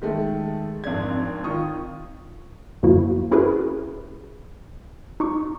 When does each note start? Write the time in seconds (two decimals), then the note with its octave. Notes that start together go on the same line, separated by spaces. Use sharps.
0.02 D#3 G#3 A3
0.84 G#1 F2 D4 G#6
1.44 D#3 F4 C#6 D#6
2.83 F#2 D3 F3 A#3 E4 F#4
3.31 C#4 E4 F#4 G#4 A#4 B4
5.20 D#4 C#6 D6